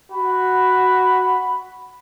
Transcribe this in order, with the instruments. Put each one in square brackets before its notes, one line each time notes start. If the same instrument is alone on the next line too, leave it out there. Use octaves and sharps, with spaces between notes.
[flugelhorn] F#4 [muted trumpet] B5